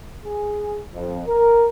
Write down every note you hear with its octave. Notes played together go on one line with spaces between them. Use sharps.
G#4
F2
A#4